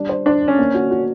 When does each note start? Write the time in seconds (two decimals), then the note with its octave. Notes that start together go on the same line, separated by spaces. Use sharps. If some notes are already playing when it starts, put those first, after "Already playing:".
Already playing: G3 D4
0.09 C5
0.26 D4 C5
0.42 D4
0.48 C#4
0.59 A#3
0.74 F#4
0.91 F#4